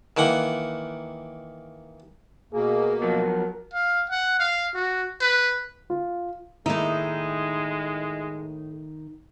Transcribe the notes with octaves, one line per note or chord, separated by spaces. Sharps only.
D#3 E3 A#3 F#5
B2 A#3 G#4
F3 F#3 B3 A#4
F5
F#5
F5
F#4
B4
F4
A2 D#3 G#3 A#3 D#4 E4